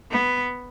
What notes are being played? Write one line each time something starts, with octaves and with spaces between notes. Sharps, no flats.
B3